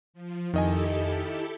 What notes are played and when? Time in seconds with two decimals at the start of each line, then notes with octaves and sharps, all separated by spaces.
0.14 F3
0.54 F2 D#3 E4 G4 A4 D#5 G#5